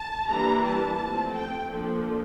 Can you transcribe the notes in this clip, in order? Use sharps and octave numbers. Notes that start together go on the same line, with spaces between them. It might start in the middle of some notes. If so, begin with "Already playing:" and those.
Already playing: A5
E3 G3 A#3 D4 A#5
A5
F3 A3 C4
G5
F3 A#3 D4 A4